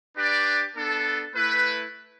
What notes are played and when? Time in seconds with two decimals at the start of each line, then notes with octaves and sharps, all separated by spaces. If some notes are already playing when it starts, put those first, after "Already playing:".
0.16 D4 G4 B4 D5
0.75 B3 D4 A4
1.35 A3 E4 B4